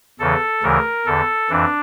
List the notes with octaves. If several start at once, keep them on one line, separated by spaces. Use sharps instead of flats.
E2 C#3 E3 A4
D2 C#3 E3 A#4
E2 D3 A4
F2 E3 D4